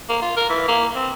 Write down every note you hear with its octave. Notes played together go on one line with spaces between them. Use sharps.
A#3
F4
A#4
E3
A#3
C4